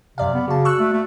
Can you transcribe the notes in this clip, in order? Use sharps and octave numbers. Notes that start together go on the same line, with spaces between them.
F#2 C3 D5 F5
B3
C#3 F#4 A5
C#6 E6 F#6
A3
A3